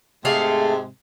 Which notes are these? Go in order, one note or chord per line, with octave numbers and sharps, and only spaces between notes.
G#2 C3 G#3 A3 G#4 F5